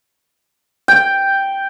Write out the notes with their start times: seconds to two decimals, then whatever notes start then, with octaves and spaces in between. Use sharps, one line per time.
0.88 G5